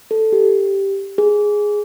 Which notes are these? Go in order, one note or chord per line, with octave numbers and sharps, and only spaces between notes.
A4
G4
G#4